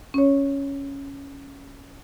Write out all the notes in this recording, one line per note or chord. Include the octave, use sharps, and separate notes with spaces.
C#4 C#5